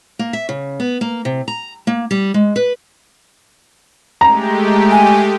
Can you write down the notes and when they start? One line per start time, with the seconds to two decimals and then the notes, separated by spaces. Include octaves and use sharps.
0.19 A#3
0.33 E5
0.49 C#3
0.80 B3
1.01 A#3
1.25 C3
1.48 A#5
1.87 A#3
2.11 G3
2.34 G#3
2.56 B4
4.21 G#3 A3 G4 A#5
4.91 G#5